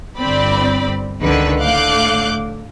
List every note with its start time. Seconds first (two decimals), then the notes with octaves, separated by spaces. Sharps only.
0.19 G1 C4 D5 B5
1.22 C#2 D3 D#3 B4
1.62 A2 D3 F5 D6 F#6 G6